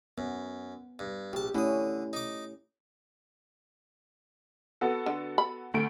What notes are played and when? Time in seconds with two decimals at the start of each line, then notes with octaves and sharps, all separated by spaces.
0.18 F#2 B3
0.99 G2
1.33 A#1 G4 A5
1.55 D3 A3 C#4 E4 D#6
2.13 D#4 D6
4.81 B3 F#4 A4
5.06 D3
5.38 B5
5.74 D2 A3 D7